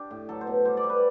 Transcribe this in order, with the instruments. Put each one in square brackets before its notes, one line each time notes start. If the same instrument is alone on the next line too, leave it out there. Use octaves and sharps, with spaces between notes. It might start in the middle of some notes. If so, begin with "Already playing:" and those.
Already playing: [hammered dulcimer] D4 G4
A2
F#3 A4
C5
B2
G3 C5
D5
G3
B4